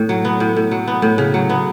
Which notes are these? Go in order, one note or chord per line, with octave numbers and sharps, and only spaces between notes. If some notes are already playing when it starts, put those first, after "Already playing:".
Already playing: A2
F#3
B3
A2
A2
F#3
B3
A2
C#3
F#3
B3